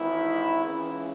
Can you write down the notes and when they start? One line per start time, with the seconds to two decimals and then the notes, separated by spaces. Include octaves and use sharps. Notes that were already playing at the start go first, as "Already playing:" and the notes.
Already playing: G#1 G#2 E3 E4
0.62 C#2 C#3 E3